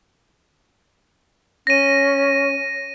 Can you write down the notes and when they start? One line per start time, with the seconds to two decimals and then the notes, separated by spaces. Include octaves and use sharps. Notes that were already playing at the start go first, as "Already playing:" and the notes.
1.67 C#4 A#6 D#7